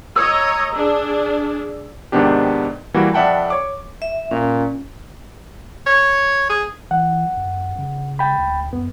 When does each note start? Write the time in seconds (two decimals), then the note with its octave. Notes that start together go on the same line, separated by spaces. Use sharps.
0.16 C#5 D#5 A#5 D#6 E6
0.72 D4 G#4
2.12 G#2 C3 D#3 B3 D4 G4
2.94 E3 G3 A#3 F#4
3.14 F2 D5 E5 F#5 G5 A5
3.50 C#5 D6
4.02 E5
4.31 A#2 C#4
5.86 C#5
6.49 G#4
6.91 E3 F#5
7.37 F#2
7.79 C#3
8.19 G5 B5
8.38 D2
8.73 F#2 B3